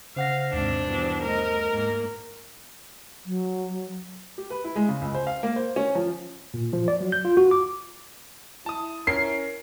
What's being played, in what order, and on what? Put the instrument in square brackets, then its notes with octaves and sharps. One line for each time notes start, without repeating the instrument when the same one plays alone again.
[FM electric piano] C#3 F#5 A#6 [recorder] C5 [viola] F5
[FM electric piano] D#2 [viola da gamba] G#2 C3 [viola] D4
[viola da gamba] G2 B2 E3
[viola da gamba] A3 D#5 [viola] A#4
[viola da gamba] G#2 G#3 A#3
[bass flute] F#3
[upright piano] G4
B4
E4
G#3
C#3
C#2
C5
F5
A#3
C5
C#4
F3
[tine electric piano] A#2
F3
D5
F#3
G6
F4
F#4
D6
[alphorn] E4 [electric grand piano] A5 D#6
[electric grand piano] C#4 A#4 [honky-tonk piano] C7